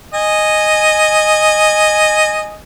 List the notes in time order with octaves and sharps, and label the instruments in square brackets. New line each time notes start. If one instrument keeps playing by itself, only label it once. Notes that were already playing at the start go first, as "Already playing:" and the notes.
[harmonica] D#5 G#5